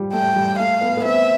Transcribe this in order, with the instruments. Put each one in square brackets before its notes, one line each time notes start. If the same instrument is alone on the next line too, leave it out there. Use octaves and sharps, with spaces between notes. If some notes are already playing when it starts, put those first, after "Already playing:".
Already playing: [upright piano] F3 G3
[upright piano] A3 [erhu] G5
[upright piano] G3
[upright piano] A3 [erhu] F5
[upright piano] B3
B3
[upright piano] C4 [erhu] E5